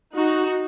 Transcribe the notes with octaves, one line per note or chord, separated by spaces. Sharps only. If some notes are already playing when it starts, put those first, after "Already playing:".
D#4 F#4